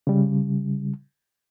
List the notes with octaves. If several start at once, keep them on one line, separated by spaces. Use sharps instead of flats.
C#3 G3